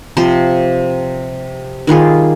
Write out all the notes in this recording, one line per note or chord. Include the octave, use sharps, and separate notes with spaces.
C3 F3 C5 C6
D#3 G3 F4 G#4